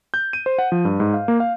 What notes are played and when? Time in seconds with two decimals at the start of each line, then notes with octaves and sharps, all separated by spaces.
0.14 G6
0.33 D#7
0.46 C5
0.58 F#5
0.72 F3
0.85 G2
1.00 G#2
1.14 F5
1.28 A#3
1.40 F5